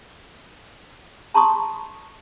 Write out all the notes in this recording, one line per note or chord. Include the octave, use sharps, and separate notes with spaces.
A5 A#5 C6 C#6 D#6